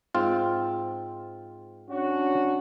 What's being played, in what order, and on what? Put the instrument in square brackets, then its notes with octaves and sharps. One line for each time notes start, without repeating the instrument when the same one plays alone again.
[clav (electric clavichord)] G#2 C4 F4
[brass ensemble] C#4 D4 F#4